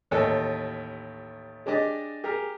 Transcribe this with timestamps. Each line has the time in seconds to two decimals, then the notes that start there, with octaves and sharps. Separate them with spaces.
0.11 A1 D#2 A3 A4 D#5
1.66 G#3 D4 G4 D5 D#5
2.24 G4 G#4 A#4